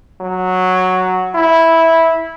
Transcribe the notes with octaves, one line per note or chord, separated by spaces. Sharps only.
F#3
E4